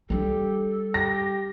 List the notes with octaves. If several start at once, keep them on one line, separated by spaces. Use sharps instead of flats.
G3 D4 G4 A4
G4 A#6